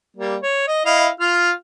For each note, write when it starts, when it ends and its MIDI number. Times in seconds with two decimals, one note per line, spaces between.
0.17 0.36 55
0.17 0.36 58
0.42 0.65 73
0.68 0.83 75
0.85 1.08 64
0.85 1.08 75
0.85 1.08 77
1.20 1.51 65
1.20 1.51 89